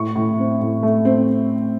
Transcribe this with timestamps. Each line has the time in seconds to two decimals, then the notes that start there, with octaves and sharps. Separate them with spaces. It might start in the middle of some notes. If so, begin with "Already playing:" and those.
Already playing: A2 C#6
0.16 A2
0.39 C4
0.61 A2
0.83 A3
1.05 C4